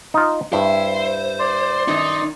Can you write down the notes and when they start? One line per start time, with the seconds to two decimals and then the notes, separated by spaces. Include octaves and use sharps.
0.14 D#4 F4
0.53 G2 E4 C5
1.39 D5 C6
1.88 F#2 D#3 D#4